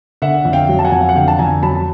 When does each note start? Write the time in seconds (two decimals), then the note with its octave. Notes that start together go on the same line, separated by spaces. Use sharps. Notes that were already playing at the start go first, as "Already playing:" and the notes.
0.22 D3 E5 F#5
0.45 F2
0.53 F5 G5
0.69 F#3
0.79 A5
0.85 F#5 G#5
0.92 F2
1.01 F5
1.09 F#5
1.16 D3 F5 G5
1.28 A5
1.39 F2 G#5 A#5
1.63 F#3 A5 B5